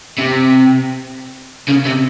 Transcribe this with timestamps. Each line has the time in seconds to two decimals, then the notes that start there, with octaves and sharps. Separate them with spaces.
0.18 C3
1.68 C#3
1.85 C3